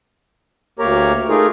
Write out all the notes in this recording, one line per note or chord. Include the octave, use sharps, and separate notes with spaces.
D2 A#3 G4 A#4 C#5 A#5
A3 D#4 F4 G#4 A#4